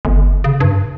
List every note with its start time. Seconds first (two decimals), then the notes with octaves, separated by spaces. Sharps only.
0.05 G1
0.44 C#3
0.60 G2